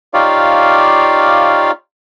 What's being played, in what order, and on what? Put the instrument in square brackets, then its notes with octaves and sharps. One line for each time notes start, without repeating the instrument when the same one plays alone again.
[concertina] D#4 F4 G4 C#5 D5 F5